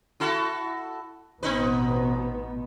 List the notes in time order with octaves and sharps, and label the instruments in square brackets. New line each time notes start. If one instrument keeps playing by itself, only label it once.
[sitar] E4 F#4 A4
[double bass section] A1 B2 B3 [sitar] C4 D#4 B4